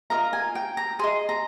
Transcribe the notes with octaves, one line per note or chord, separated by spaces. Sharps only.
F4 A#4 D#5 A#5
G#5
G5
A#5
G#4 D#5 C6
A#5